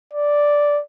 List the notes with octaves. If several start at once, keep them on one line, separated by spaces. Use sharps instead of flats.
D5